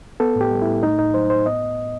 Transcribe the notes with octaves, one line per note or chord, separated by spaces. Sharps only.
B3 A4
A2
G4
G3
E4
A2
A3 D#4
A2 D#4
F#3 C5
A2 C5
B3 D#5